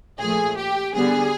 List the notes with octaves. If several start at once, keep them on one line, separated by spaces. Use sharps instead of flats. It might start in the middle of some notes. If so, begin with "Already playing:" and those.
A#2 F3 A3 G#4
G4
D3 G3 B3 G#4